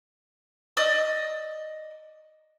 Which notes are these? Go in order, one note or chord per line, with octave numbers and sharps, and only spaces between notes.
D5 D#5 D#6 E6